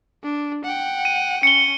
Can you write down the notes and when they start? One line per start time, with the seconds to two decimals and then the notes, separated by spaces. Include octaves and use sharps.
0.23 D4
0.64 F#5 G5
1.05 D#7
1.43 C#4 C#7 G7